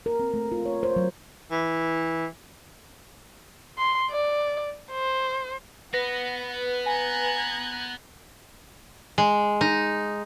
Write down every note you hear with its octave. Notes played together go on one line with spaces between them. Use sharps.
A#4
C4
A3
F4
C#5
C5
F#3
E3
C6
D5
C5
B3 B4 F#5 A#6
G#5 A#5 F#6 G#6
G#3
D#4